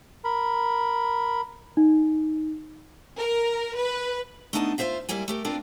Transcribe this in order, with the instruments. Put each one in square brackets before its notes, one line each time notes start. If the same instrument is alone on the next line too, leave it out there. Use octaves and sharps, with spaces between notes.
[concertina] A#4 B5
[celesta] D#4
[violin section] A#4
B4
[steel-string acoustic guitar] A3 B3 D4 D#4 F#5 A5
F4 F#4 C5 E5 F5
G#2 G3 A#3 E4 G#5
A3 G4 A#4
A#3 C4 D4 F4 A#4 B4